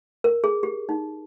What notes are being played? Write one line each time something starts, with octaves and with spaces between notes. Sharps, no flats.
A#4
G#4
G4
D#4